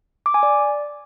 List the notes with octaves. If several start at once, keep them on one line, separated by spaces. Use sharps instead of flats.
D6
G#5
D5